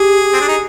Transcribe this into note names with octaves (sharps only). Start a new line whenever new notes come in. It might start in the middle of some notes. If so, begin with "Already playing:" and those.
Already playing: G4 G#4
C4
D4
D#4